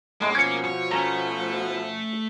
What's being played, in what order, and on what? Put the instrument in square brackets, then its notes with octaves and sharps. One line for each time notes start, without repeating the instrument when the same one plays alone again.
[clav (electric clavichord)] A2 G#3 [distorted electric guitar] A#3
[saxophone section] B2 F3 [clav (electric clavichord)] C#4 [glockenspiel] G#6 C#7
[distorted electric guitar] C#5
[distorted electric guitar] A3 [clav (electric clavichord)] C#4 A#5